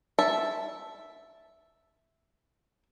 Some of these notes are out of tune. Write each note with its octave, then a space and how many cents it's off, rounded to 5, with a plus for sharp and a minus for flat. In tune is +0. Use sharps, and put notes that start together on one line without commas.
E5 +0 A5 +0